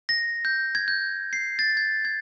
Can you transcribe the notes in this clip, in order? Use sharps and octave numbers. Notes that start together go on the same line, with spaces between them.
A#6
G6
G#6
G6
C7
A6
G#6
G#6